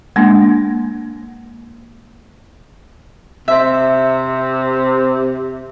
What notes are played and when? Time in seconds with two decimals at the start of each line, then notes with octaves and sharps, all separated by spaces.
0.16 G#3 A#3 D4
3.48 C3 E5